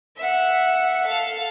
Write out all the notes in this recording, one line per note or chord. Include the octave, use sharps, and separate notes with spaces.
E5 F#5
A4 F5